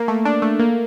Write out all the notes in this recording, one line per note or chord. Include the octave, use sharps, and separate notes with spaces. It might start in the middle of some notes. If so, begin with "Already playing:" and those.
Already playing: A#3
A3
D4
A3
A#3